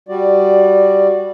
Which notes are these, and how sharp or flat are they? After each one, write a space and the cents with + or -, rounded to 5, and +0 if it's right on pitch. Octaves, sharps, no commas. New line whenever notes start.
G3 -5 F#4 +0 D5 +10